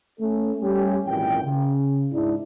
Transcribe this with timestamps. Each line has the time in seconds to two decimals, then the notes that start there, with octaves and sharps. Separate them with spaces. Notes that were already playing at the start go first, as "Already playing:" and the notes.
0.20 A3 C#4 A4
0.61 G3 A3 C#4 G4
1.06 G#1 F#2 A#2 E3 G5
1.44 C#3
2.12 G#2 D4 E4